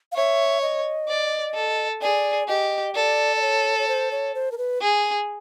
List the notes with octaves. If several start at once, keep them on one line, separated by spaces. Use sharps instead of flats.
F5
C#5 E5
D#5
D5
A4
G#4 D5
G4 D#5
A4 D5
D5
C#5
C#5
C5
C#5
C5
A#4
B4
G#4